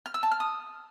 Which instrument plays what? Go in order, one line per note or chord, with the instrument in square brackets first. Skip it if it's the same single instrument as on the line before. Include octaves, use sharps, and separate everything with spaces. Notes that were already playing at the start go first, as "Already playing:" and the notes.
[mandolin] F6
E6
A5
F6
D#6